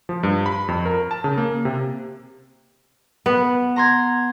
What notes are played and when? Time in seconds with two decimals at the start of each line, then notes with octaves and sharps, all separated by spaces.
0.09 F3
0.23 G2
0.46 B5
0.68 F2
0.85 A#4
1.11 A5
1.24 C#3
1.38 A#3
1.65 C3
3.26 B3
3.76 A#5 C6 G#6